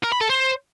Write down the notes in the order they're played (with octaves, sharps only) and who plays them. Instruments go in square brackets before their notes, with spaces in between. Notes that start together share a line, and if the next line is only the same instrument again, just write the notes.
[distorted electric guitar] A#4
B5
A4
C5